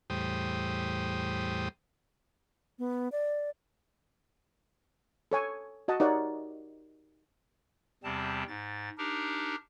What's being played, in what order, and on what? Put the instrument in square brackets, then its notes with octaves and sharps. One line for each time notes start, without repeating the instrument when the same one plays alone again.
[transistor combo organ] E2 A2 G3 C5 G5 D#6
[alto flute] B3
D5
[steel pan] A4 C#5 G#5
F#4 D#5 F#5 A5
D#4 G4 A#4 C#5 D5 F#5
[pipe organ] E2 C3 G3 C4 A5
G#2 A6
D4 D#4 G4 A#4